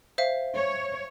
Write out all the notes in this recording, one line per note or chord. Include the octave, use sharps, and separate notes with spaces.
C5 E5 F5
C#5